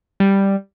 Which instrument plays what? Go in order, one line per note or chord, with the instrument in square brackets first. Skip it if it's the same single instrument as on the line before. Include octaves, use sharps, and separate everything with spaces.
[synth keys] G3